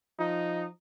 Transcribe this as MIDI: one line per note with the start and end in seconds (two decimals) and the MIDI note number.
0.19 0.67 53
0.19 0.66 63